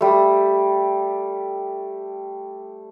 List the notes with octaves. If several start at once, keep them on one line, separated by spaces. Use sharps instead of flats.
G3 A3